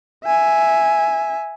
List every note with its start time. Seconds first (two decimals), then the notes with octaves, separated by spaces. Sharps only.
0.25 E5 G#5